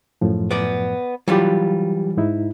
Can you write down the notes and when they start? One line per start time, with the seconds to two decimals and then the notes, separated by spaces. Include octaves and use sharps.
0.21 F#2 A2 F3
0.51 B3 D5
1.28 E3 F#3 G3 F4 G4
2.17 G#2 D#4 E4